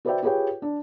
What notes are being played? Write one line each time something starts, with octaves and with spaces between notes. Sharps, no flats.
F#4 B4 C5 D5 E5 G5
F4 G4 G#4 B4 C#5 G5
D4